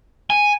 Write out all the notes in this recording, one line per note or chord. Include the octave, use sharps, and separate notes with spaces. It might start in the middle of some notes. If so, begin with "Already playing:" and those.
G#5